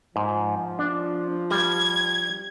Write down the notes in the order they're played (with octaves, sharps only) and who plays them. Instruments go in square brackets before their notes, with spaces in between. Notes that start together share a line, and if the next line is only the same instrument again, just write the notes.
[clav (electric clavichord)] G#2 [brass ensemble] F3
[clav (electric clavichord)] D4
[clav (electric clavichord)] G3 [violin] G#6